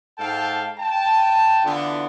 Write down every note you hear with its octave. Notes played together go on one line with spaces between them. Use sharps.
G#2 A4 F5 G5 A5
G5 A5
D3 E3 B3 E4 F4